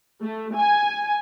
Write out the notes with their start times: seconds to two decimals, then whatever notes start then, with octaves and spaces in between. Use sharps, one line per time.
0.23 A3
0.56 G#5